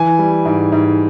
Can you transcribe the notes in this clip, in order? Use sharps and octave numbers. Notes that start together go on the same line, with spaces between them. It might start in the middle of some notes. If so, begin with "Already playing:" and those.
Already playing: E3 G#5
G3
G#2
G#2